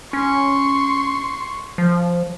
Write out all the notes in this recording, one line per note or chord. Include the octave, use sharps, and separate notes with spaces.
C#4 C6 C#6
F3